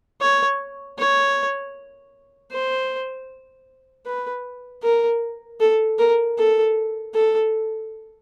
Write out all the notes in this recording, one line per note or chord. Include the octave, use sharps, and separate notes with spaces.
C#5
C#5
C5
B4
A#4
A4
A#4
A4
A4